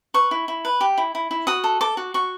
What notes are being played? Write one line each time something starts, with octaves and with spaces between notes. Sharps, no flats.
B4 C#6
E4
E4
B4
G4
E4
E4
E4
F#4 D#6
A4
A4 D6
F#4
F#4 C#6